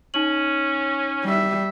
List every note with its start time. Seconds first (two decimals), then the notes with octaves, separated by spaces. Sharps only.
0.14 C#4 D#4 F#7
1.24 G3 E5